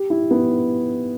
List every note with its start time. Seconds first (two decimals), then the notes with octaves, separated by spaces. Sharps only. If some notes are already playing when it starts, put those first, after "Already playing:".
Already playing: G4
0.10 E4
0.31 B3